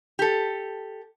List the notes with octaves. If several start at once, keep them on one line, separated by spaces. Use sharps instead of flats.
G4 A4